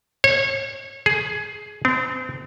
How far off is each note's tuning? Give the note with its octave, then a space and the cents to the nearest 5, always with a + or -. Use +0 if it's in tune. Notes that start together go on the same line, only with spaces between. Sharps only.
C#5 -30
G#4 +15
C4 -35